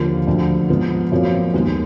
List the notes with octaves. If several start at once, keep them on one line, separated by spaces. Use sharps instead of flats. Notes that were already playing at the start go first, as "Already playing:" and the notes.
Already playing: D#2 D3 F3 A#3 F4
D2 D3 F3
G#2 F3 B3 F4
G#1 F#2 F3 A#3
D#2 D#3 G#3 B3